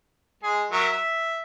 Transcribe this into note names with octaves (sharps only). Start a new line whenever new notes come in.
G#3 G#4
F#3 A#4 E5
E5